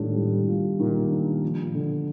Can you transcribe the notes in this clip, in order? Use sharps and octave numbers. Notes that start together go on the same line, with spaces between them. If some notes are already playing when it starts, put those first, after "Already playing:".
Already playing: A2 D#3 G3 D4 F4
G3
F4
A#2 D#3
D4
F3
D3